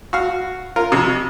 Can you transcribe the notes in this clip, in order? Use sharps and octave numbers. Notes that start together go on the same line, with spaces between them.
F#4 F5
F4 A#4
F2 C3